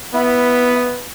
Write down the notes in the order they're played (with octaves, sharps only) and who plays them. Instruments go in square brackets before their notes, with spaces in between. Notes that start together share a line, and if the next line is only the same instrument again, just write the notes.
[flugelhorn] B3 [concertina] E4